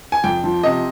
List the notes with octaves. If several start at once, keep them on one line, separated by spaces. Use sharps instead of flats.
G#5
F2 G5
F3
C3 D#5